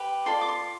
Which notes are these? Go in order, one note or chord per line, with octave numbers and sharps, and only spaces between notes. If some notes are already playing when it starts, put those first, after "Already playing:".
Already playing: G4 B4
F4 A4 D5 C6
D6
C6